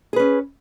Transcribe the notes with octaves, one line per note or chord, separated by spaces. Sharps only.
C#4 G#4 B4